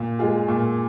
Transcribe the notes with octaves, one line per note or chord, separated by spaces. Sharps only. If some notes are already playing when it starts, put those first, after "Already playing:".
Already playing: A#2
G#3 F4 G#4
A#2